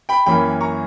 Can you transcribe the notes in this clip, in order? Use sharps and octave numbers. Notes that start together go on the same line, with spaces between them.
G5 B5
F#2 E3 A#3 C#4 G5 B5
A#5 C#6